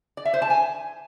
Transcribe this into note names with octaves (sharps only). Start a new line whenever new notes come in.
D5
E5
C5
A5
G#5